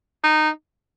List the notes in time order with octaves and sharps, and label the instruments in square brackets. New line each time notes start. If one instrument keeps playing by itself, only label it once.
[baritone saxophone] D#4